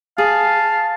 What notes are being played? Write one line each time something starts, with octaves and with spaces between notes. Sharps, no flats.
G#4 F5 A5